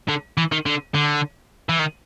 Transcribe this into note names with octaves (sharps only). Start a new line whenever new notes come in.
D3
E3
D#3
D3
D3
E3
D#3